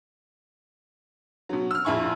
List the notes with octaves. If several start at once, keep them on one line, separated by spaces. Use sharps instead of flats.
B2 F#3
E6 F6
A#1 F2 F3 E4 G#4 C#6